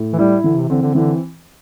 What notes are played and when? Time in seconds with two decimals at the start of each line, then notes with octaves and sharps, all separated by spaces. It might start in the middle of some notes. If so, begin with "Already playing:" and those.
Already playing: A2
0.13 E3
0.19 G3 E4
0.44 D3 E3
0.56 C3
0.70 D3 C4
0.82 D3
0.95 D3 E3